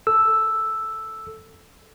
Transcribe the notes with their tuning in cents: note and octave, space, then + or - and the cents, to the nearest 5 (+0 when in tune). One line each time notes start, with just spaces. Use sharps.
A4 +0 E6 +0